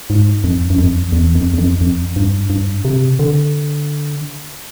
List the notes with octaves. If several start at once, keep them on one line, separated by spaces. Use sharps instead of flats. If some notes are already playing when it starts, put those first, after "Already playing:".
G#2
F2
F#2
F2
E2
F2
E2
F2
F2
G2
G2
C3
D3